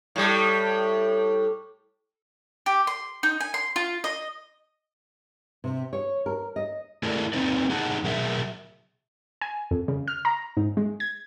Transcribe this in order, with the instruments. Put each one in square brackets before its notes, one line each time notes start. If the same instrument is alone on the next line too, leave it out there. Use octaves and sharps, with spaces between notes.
[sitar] A2 G3
[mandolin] G4
C6
D#4
G#5
C6
F4
D#5
[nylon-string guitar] C3
C#5
A#4
D#5
[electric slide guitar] A3 D4 E4 G#4 A#4 D5
A#3 C4 D#4 B4 D5
A#3 D4 D#4 G#4 F#5 A5
B2 F#3 G#4 A#4 E5
[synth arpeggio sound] G#5
F2
C#3
F6
A#5
G#2
G#3
G#6